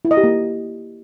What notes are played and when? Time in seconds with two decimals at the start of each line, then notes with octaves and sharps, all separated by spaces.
0.05 E4
0.11 D#5
0.17 G4
0.24 A#3